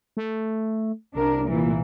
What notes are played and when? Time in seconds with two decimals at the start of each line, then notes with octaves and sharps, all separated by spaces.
0.17 A3
1.15 C2 D4 A#4
1.49 A#2 E3